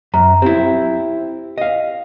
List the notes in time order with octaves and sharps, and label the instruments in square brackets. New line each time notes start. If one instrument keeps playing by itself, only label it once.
[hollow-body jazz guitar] F#2 [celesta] A#5
[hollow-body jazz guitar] C4 E4 [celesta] G4
[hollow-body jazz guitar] D#5 F5